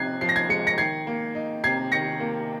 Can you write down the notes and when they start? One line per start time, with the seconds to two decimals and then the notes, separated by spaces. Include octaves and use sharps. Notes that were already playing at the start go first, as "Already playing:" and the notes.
Already playing: C3 F3 D#4 F#6 G#6 C7
0.21 F3 C7
0.29 A#6
0.36 G#6 C7
0.49 G#3 C#7
0.67 A#6 C#7
0.78 D#3 G#6 C7
1.07 A#3
1.35 D#4
1.64 C3 G#6 C7
1.92 D#3 A#6 C#7
2.20 A#3